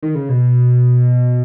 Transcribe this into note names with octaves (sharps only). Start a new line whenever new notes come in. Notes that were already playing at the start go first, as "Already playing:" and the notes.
D#3
C#3
B2